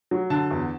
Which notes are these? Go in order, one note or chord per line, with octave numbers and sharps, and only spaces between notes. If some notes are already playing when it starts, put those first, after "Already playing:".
F#3
D3 A5
E2